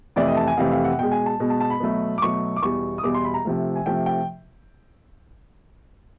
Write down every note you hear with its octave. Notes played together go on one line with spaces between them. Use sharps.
F2 C3 E3 A3 D5
D#5
A5
G#5
F2 C3 E3 A3 F5
F5
F#5
B2 G#3 G5
G#5
A5
B2 G#3
A5
A5
B5
B2 F#3 A3
D6
B2 F#3 A3 C#6
D6
E2 B2 G3 C#6
D#6
E2 B2 G3 D6
C6
B5
A#5
C3 F3 A3
G#5
C3 F3 A3 G5
G5